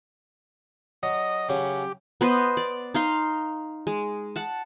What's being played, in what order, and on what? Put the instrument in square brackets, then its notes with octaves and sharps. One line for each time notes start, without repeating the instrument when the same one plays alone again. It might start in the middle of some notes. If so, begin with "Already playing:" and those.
[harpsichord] F#3 [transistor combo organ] D#5
[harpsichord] C#3 F#3 C#4 [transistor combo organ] G4
[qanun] B3 B4 C5 D#5
D5
D#4 F5 C6
G#3
F#5 A5